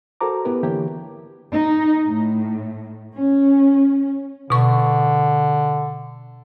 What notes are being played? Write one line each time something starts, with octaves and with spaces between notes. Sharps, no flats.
F#4 A4 A#4 C5 A#5 D6
B3 E4 G4 A#4 B4
D3 E3 A#3 E4 G4 C#5
D#4
A2
C#4
B2 D3 C#6